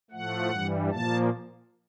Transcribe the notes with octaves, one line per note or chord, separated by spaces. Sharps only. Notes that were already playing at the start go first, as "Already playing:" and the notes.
A2 F3 A3 F#5
G2 E3 G3
A#2 F3 A#3 A5